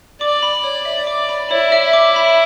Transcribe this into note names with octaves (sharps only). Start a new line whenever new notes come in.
D5 D6
B5
C#5
E5
D6
B5
E4 C#5
E5
D6
B5